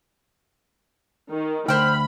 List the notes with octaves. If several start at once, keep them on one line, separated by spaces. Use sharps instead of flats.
D#3
D2 C5 G5 B5 F6